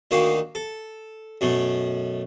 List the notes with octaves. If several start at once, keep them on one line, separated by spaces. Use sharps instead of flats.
D2 D#3 A#3 F#4 F5 D#6
A4
F#2 B2 A3